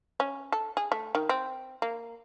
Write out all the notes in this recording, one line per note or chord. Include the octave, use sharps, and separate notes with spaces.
C#4
A4
G#4
A3
D#3
C4
A#3